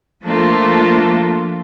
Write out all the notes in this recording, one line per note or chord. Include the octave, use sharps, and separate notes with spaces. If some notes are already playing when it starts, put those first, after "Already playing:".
F3 A3 A#3 D4 F4 A4